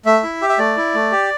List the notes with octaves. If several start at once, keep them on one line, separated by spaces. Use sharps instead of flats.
A3 E5
E4
G4
E5
A3 D5
E4
A3
G4